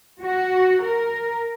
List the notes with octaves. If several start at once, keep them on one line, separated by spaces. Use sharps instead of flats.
F#4
A#4